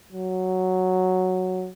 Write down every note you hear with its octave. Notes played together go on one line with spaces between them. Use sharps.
F#3